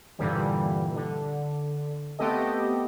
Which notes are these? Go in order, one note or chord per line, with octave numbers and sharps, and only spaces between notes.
G2 A#2 D3 E3 G3
D3
A3 B3 C4 G4 A4 D#5